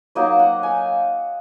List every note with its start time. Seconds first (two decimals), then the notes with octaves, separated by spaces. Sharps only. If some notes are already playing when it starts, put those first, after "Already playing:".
0.15 F#3 A#3 D#4 D#5
0.39 F#5
0.63 G#5